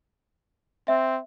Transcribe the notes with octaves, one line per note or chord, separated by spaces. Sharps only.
C4 E5